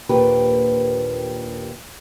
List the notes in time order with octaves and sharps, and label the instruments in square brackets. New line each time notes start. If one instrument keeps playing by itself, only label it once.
[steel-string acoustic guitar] D#2 A#2 F3 D4 G4 B4